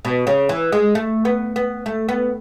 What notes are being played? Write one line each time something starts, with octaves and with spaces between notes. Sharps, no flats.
B2
C#3
E3
G#3
A3
B3
B3
A3
B3